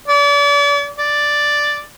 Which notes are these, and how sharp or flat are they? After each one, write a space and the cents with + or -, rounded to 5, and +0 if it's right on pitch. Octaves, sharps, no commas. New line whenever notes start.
D5 -40
D5 +0